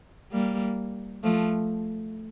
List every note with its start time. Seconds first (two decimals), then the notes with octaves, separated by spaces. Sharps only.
0.32 G3 A#3
1.23 F3 A3